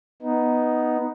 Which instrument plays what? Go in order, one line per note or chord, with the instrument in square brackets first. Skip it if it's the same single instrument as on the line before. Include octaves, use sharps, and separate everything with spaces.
[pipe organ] B3 D#4